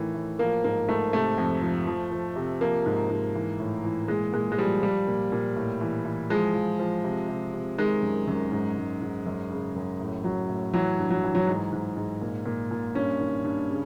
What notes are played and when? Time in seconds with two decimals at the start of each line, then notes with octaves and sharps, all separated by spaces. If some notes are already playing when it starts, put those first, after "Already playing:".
Already playing: A2 D#3 E3
0.14 A2
0.39 F3 A#3
0.64 G#2 A#3
0.89 G#2 A3
1.13 C3 A3
1.38 F2
1.62 F3
1.87 F3
2.11 F3
2.36 C3
2.61 F3 A#3
2.86 G#2
3.10 G#2
3.35 E3
3.60 A2
3.84 E3
4.08 A#2 G#3
4.33 A#2 G#3
4.52 G#3
4.58 F3 G3
4.82 F3 G3
5.07 A#2
5.32 A#2
5.56 A2
5.81 E3
6.05 E3
6.30 F3 G#3
6.54 F3
6.80 F3
7.04 C3
7.28 C3
7.53 C3
7.78 D#3 G#3
8.02 F#2
8.27 F#2
8.52 G#2
8.77 G#2
9.02 G#2
9.26 F#2
9.51 C#3
9.76 F#2
10.00 A2
10.24 F#3
10.49 A2
10.74 E3 F#3
10.98 G2
11.10 F#3
11.24 E3
11.35 F#3
11.47 G#2
11.72 G#2
11.96 G#2
12.21 A#2
12.46 A#2
12.71 A#2
12.95 G2 C#4
13.20 D#3
13.44 G2
13.70 C#3